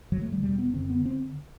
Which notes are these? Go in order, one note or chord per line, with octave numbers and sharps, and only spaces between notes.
G2 D3 F#3
A3
G3
E2 B2 G3
B3
F#2 D3 C4
B3
D3 C4